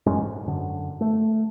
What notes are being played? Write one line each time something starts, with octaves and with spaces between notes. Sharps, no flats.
A1 F#2 G#3 C#4
G#2
F#2 D3
A3